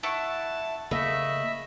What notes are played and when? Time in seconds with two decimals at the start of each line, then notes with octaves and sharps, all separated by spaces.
0.03 E4 F#5 A5 C#6
0.91 C#3 A3 A#3 D#5 E5 B5